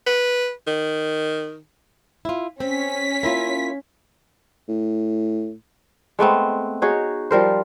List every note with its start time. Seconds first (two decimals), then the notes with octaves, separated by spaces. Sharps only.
0.06 B4
0.67 D#3
2.25 E4 F4
2.60 C4 C#4 B6
3.23 A#3 E4 F4
4.68 A2
6.19 G#3 A3 B3 C4
6.82 D#4 F#4 G#4 C#5
7.31 F3 G3 A#4 C5